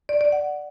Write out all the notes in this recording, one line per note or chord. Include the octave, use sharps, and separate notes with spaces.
D5
D5
F#5